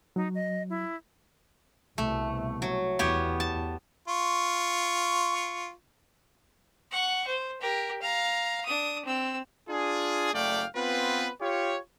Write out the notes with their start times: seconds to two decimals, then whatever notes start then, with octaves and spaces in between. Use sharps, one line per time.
0.16 F#3 D#4
0.35 D#5
0.70 E4
1.98 C2 B2 A3
2.62 F#3
2.99 E2 B3 G4 C#5
3.40 A5
4.08 F4 C#6
6.91 F#5 C#6
7.27 C5
7.61 G4 A#4
8.02 F5 A#5
8.66 D4 D#6
9.05 C4 E6
9.69 D4 F4 G#4
10.34 F#1 A3 D5 F5 G5
10.76 B3 C4 F4 B4
11.42 F4 G4 C#5